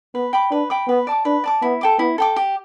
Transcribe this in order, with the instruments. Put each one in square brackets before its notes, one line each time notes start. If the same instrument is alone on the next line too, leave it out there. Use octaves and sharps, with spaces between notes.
[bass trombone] B3 [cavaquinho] B4
[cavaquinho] G5 B5 D6
[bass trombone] D4 [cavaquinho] B4
[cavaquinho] G5 B5 D6
[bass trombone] B3 [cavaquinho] B4
[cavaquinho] D5 A5 D6
[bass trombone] D4 [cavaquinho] B4
[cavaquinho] D5 A5 D6
[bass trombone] B3 [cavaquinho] E4
[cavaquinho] A4 G5 D6
[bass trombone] B3 [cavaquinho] E4
[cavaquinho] A4 G5 D6
G4